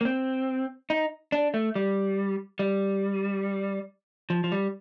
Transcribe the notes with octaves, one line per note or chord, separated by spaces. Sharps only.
A#3
C4
D#4
D4
A3
G3
G3
F3
F3
G3